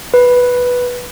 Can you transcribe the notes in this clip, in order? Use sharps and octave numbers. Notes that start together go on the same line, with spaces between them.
B4